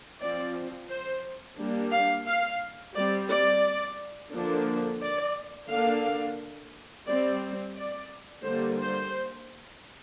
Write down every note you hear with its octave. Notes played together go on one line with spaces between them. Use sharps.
F3 C4 D5
C5
G3 A#3 D4
F5
F5
G3 C4 D5
D5
D3 F3 A#3 D4
D5
D3 A#3 D4 F5
G3 C4 D5
D5
D3 G3 A#3 C5
C5